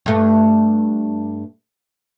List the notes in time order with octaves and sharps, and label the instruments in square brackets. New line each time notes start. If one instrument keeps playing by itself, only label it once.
[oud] G2 A3